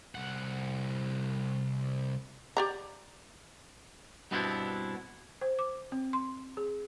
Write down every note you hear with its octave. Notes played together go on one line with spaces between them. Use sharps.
C2 F#5
G4 D5 A#5
G2 B2 B3 C4 D4 E4
C5
D6
C4
C6
G#4